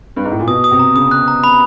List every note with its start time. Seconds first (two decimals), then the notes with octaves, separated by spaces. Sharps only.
0.17 G2
0.24 G#2
0.32 A2
0.39 A#2
0.47 B2 D#6
0.64 D#6
0.71 C3
0.79 A#5
0.95 C#3 D#6
1.11 F#6
1.28 A#5
1.44 B5